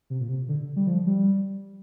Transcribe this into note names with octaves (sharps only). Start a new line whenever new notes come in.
C3
A#2
C3
D3
G3
F3
G3